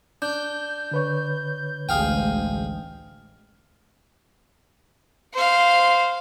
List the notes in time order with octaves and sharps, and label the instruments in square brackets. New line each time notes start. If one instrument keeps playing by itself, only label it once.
[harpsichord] D4 [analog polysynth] G6
[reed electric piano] D3 B4 C#5
[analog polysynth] A1 [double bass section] D2 G#3 [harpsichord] G#4 F5 G5
[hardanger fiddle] C5 F5